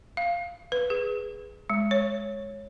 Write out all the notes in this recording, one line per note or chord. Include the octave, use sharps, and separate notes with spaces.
F5
B4
G#4
G#3
C#5